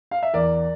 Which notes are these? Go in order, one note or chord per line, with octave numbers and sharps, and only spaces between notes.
F5
E5
E2 A#4 D5